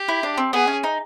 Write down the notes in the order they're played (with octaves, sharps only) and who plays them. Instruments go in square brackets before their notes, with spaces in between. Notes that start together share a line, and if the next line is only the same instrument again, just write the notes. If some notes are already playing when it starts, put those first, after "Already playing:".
Already playing: [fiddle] G4
[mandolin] E4
D4
C4
[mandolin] B3 [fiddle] G#4
[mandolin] C#4
D#4